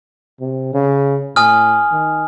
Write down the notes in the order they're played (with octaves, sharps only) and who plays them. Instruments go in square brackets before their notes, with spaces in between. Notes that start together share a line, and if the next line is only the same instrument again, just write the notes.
[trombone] C3
C#3
[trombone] A2 [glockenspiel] G#5 D#6 F6
[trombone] D#3